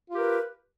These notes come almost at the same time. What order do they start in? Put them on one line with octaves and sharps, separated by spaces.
F4 G4 A#4 B4